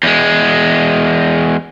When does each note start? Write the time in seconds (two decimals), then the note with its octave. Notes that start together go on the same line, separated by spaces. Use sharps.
0.03 E2 G#3